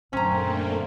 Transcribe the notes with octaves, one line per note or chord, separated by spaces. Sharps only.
F#2 A#2 D3 A3 A#3 C4 C#4 A#5